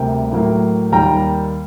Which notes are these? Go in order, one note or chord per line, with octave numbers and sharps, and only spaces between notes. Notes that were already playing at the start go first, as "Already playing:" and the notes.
Already playing: D2 C3 G3 A#3 G5
A2 F#3 A#3
D#2 D#3 G3 A#3 G5 A#5